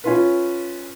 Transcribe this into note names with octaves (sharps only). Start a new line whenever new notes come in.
C#4 F4 B4